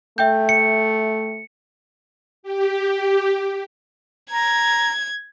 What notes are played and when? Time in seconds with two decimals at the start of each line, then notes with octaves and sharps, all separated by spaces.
0.18 A3 E5 G5 G6
0.49 C#7
2.43 G4
4.32 A#5 G#6